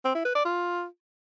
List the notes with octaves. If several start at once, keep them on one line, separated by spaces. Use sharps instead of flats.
C4
E4
B4
D5
F4